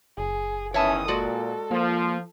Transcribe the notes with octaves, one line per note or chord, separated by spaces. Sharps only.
F#1 G#4
E2 D#3 E3 C#4 C#5 E5 A5 D#6
A#2 G#3 F#4 A4 D5
F3 A#3